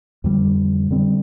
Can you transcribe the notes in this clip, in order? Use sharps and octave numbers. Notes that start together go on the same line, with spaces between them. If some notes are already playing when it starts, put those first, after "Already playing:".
F2 D3 G3
D3 G3 C4